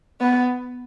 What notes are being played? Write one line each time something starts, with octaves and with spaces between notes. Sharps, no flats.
B3